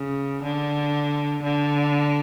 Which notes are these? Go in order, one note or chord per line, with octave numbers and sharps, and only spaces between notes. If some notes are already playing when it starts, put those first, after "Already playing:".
Already playing: C#3
D3
D3